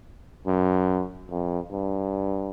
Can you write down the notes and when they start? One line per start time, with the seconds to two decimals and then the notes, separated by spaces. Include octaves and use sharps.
0.46 F#2
1.30 F2
1.71 G2